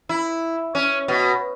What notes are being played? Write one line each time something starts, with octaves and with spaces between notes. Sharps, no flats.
E4
C#4
B2